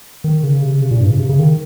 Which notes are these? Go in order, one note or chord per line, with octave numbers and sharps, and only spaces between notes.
D#3
C#3
C3
C#3
C3
A#2
G2
C#3
C3
C#3
D#3